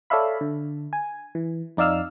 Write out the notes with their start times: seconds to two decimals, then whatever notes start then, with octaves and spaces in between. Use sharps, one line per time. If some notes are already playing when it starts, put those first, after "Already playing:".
0.10 A4 C#5 D5 E5 F5 B5
0.41 D3
0.93 G#5
1.35 E3
1.77 F2 D#4 D5 F5 E6 F6